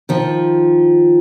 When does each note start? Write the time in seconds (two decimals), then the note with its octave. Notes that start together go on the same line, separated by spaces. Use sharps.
0.09 D#3 F3